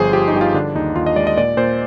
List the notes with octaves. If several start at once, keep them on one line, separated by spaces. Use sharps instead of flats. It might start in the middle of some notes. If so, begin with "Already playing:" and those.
Already playing: G1 F3 G#4 C5
F3 G4
D#4
G2 G4
F4
D3 D4
D#2 D#4
D#2 F4
D#5
G#3 D5
D#5
A#2 D5
A#2 C5